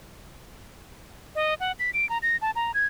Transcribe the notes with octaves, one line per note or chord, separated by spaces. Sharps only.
D#5
F#5
B6
D7
A#5
A#6
A5
A#5
G#6